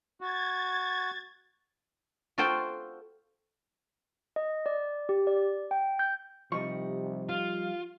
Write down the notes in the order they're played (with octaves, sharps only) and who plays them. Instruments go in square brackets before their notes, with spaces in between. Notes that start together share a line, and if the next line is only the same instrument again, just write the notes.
[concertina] F#4 [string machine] G#6 A6
[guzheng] F4 F#4 A4 C5 G5
[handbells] D#5
D5
G4
D5
G5
G6
[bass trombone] C3 [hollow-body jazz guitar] F3 G3 D#4 [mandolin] C#6
[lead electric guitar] F4 [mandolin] F5